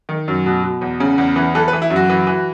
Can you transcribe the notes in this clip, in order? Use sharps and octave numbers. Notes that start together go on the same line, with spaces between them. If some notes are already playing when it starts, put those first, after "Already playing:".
D#3
F#2
B2
B2
E2
C#3
E2
E3
E3 A4
B4
E3
E4
F#2
F#4
E3
E3